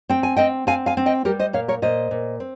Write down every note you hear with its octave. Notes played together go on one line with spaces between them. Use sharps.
C4 G5
G#5
C4 D#5 G5
C4 F5 G#5
F5 G#5
C4
D#5 G5
G3 G4 A#4
C5 D#5
A#2 C#5 F5
A#4 C#5
A#2 C5 D#5
A#2
C4